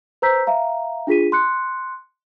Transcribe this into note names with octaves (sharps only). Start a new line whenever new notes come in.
B4 C5 A#5 E6 G6 B6
E5 F5 A#5
D4 F4 G#4 B6 D#7
C6 F#6 C#7